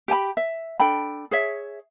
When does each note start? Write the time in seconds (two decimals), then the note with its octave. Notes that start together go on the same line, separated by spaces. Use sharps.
0.08 G4 G5 G#5 B5
0.37 E5
0.80 D4 A4 G5 B5
1.31 G#4 C#5 E5